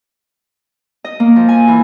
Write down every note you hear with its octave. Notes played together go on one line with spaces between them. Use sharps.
D#5
A#3
F3
G#5
E3